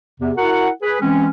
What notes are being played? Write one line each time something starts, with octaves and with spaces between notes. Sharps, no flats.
E2 C3
E4 F#4 A#4 F#5
G#4 B4
E3 G#3 C4 C#4